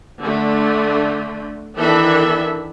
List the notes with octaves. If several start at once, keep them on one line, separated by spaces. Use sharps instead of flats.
D3 A3
D#3 E3 B3 D4 A4 E5